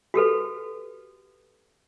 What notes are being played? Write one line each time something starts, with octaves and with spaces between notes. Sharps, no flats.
F#4 G4 A4 B4